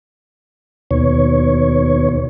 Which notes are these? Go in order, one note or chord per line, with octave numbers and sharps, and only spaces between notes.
D#2 B2 C#5